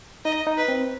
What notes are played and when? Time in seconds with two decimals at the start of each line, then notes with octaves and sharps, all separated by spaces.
0.25 D#4 D#5
0.47 D#4
0.57 B4
0.68 C4